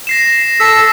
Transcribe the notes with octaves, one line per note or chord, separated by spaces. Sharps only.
A#6 C7 E7
A4 E6 B6